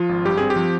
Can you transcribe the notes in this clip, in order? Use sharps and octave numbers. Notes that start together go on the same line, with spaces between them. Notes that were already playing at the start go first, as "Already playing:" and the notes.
Already playing: F3 F4
G#1
G2 G4
C4 G#4
G4
F3